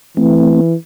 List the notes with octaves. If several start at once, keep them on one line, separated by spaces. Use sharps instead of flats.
E3 A3 C4